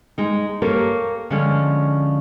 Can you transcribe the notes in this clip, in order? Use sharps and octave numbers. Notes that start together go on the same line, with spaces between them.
G#3 D#4
A#3 G4 A4 A#4 C#5
D3 F3 G#3 C#4 D4